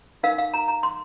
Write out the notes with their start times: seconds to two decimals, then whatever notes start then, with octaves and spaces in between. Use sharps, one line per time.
0.23 D#4 A#4 F5
0.38 F5
0.54 A#5
0.68 A#5
0.83 C6